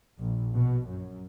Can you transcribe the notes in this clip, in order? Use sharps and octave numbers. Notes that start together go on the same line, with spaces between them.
A#1
B2
F#2